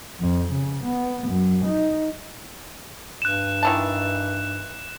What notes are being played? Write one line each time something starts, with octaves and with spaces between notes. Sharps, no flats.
F2
C#3
B3
F#2
D#4
G2 F#6 E7
D#3 E3 A5